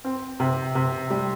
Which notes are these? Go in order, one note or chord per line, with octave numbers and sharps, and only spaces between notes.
C4
C3
C3
G3